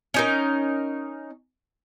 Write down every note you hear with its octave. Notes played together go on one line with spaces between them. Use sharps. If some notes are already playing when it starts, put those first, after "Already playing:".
C#4 D#4 A#4